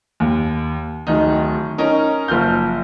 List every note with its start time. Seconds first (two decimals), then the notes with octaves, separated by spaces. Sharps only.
0.20 D#2
1.07 D1 D#3 D#4
1.78 C#4 D#4 A#4
2.28 F#1 F3 F6 G6